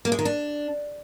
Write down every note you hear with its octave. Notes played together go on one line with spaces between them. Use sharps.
A#3
G#3
D#3
D4